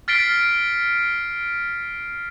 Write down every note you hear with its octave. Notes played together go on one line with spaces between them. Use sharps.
F6 A6 B6 C7 D7 G7